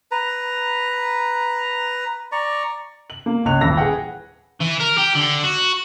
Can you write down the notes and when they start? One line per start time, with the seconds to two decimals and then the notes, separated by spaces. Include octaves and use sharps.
0.11 B4 A#5
2.32 D5 A#5 C#6
3.10 F#7
3.26 A#3
3.45 C#2 C#5 F#6 F7
3.61 D#1 A1 B5 E6 A#6
3.77 G#4 B4 F#5 G5
4.61 E3
4.81 A#4
4.98 G4
5.15 D3
5.44 F#4